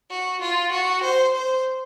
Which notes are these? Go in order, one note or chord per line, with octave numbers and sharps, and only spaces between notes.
F#4
F4
F#4
C5
C5